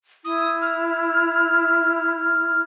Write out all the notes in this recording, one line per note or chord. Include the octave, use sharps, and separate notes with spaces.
E4 D#6
F6